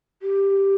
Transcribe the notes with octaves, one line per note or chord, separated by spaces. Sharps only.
G4